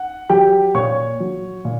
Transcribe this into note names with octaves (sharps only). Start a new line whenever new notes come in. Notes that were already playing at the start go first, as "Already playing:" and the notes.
Already playing: F#5
F#3 G4 G5
A#2 C#5 C#6
F#3
A#2